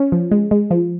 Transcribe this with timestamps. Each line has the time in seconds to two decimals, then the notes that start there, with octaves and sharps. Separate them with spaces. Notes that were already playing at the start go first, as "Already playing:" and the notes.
Already playing: C#4
0.12 F3
0.31 G#3
0.51 G#3
0.71 F3